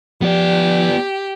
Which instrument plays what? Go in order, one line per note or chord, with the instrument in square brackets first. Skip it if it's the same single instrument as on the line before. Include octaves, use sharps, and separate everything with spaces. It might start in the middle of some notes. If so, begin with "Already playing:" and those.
[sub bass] F3 [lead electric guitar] B3 D5 [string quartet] G4